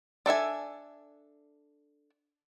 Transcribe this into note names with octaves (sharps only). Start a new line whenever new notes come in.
D4 A4 E5 G#5